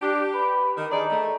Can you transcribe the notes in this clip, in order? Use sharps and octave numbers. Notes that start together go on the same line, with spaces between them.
D4 G4
B4
D#3
D4 D#4 G#4 D5
A3